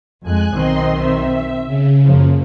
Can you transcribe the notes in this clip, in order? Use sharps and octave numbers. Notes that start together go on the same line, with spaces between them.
F2 G#3 G#5 F#6
B1 D#3 C4 D#5 C6
E5
C#3
F#2 F3 A#3